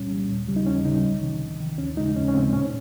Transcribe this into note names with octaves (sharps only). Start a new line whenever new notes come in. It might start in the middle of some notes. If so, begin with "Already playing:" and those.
Already playing: C2 A#2 G3 C#4
A#2 G3
D#2
C#3 G3
D#4
D#2 C#4
C#3 G3 D#4
C2
C3 D#3
C2
C3 D#3
D#2 C#4
C#3 G#3 D#4
D#2 C#4
C#4
C#3 G#3 C4
A#2 C#4